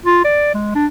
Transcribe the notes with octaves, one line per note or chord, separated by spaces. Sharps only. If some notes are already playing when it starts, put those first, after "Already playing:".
F4
D5
G#3
D4